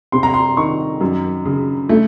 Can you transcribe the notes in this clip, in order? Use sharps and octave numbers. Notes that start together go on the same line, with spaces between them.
C3 C6
A#5
C6
D#3 C#6
F#2
C#3
A3